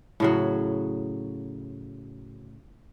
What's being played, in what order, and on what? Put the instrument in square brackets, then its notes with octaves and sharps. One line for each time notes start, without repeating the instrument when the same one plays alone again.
[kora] A2 C#3 F#3